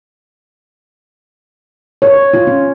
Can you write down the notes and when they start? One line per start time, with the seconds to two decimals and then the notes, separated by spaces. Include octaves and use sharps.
2.02 C#5
2.33 F4
2.47 C#4